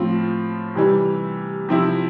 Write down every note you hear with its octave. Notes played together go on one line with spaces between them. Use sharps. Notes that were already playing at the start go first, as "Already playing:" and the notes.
Already playing: A2 F3 C4 F4
C3 E3 G3
C3 F3 C4 E4